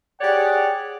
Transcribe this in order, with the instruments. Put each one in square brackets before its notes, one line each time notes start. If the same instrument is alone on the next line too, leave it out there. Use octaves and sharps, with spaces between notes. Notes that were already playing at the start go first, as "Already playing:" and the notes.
[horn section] G4 G#4 C#5 D5 F#5